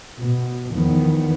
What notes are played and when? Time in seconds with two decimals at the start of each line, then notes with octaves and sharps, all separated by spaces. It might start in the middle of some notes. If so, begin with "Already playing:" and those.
0.21 B2
0.71 E2 D#3 F3 B3